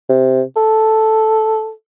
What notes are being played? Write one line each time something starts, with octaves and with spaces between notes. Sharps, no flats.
C3
A4